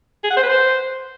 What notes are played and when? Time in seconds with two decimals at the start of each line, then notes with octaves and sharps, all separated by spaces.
0.24 G#4
0.30 F#5
0.37 C5
0.43 B4
0.49 C5